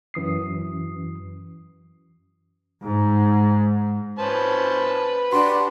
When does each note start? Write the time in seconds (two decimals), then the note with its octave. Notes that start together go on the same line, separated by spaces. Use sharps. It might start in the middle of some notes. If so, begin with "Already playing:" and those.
0.14 F#2 E3 D#6 C7
2.84 G#2
4.19 C#4 B4 C5 A5
5.32 D4 F#4 G4 C6